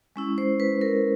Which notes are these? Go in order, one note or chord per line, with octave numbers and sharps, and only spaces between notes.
G#3 C#4 E4
C5
B4
A#4